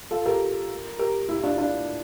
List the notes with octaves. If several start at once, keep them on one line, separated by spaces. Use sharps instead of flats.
F4 A4
G4 A#4
G4 A#4
E4 G4
E4
D4 F4
D4 F4